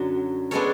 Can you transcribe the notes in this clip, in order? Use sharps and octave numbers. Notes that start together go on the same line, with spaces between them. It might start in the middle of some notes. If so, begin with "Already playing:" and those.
Already playing: F#2 D3 F#3
G#3 B3 D4 A4 C#5